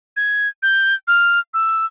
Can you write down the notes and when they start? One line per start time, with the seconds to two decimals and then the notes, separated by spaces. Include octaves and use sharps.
0.17 G#6
0.63 G6
1.08 F6
1.54 E6